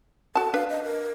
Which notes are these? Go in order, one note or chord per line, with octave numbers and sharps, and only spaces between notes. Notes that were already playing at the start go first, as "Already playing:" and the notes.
F#4 A4 A5
D4 B4 F5
D#5
A#4